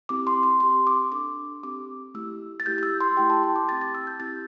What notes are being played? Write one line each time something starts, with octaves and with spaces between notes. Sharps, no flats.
C4 E4 G4 D6
C6
C6
C4 G4 C6
D6
D4 A4 D6
C4 G4 D6
A3 E4 G4 E6
A6
A3 E4 G4 G6
G6
E6
C6
A3 E4 G4 G5
A5
C6
D6
C4 G4 A6
A6
E6
G6
C4 E4 G4 A6